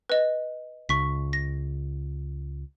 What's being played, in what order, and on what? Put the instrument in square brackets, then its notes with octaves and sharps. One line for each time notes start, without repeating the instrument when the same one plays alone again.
[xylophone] B4 D#5
[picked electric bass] C#2 [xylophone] C#6 B6
[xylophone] A#6